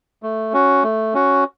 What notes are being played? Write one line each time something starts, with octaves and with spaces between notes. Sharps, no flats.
A3
C#4 F#4
A3
C#4 F#4